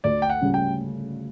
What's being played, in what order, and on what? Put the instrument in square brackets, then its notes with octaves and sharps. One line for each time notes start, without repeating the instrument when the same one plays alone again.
[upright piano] D2 [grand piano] D5
[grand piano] G5
F#5
[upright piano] C#3 G3 C#4
[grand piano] G5